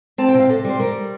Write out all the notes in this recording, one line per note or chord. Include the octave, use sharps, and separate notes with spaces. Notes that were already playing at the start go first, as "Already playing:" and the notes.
C4 A5
G5
C3
F5
C3 A4
G3 C5
G3 A#4